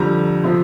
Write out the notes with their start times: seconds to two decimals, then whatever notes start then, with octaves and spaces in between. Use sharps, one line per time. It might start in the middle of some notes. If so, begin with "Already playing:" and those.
Already playing: F2 D3 G3 A#5
0.44 C3 F3